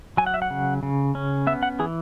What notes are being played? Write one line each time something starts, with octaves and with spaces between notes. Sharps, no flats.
F#3 G#5
F#5
E5
F#5
C#3
C#3
C#4
B3 E5
F#5
E3 G#4